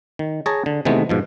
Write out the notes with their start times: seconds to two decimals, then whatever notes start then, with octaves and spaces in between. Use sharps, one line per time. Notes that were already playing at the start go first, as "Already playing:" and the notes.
0.19 D#3
0.46 G#4 C#5 A5 A#5
0.66 D3
0.85 C3 D#3 E3 G#3 A3 B3
1.09 G#2 B2 F3